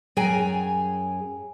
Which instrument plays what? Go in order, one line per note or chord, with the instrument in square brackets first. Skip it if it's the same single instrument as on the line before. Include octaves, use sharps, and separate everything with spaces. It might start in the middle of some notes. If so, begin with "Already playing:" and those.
[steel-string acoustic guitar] F#2 G#4 G5 G#5 A#5